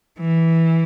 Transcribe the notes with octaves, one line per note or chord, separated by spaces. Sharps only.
E3